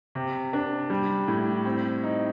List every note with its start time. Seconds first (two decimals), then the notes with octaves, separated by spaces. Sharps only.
0.15 C3
0.53 D4
0.90 G3
1.28 A2
1.65 C4
2.03 D#4